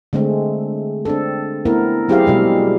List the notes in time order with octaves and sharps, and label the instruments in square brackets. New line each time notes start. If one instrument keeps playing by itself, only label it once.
[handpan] D3 G#3 A3 C4
C4 D4 A4
A3 B3 C4 E4 A#4
F#3 C4 E4 G4 G#4 F5
B2 G3 G#3